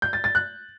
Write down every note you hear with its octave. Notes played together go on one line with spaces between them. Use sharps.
G6
A6
A6
F#6